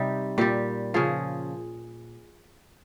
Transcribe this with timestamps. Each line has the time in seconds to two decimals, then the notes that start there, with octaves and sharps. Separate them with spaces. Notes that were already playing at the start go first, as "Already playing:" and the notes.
Already playing: C3 G3 D#4 G4
0.38 A#2 G3 G4
0.94 C#3 F3 G#4